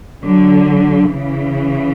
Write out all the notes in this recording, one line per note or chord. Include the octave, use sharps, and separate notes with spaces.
D3 F#3
C#3 E3